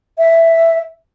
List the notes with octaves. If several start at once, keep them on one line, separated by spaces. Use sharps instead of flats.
E5